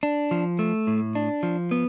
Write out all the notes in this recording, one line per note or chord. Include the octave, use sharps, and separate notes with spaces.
D4
F3
A3
A2
D4
F3
B3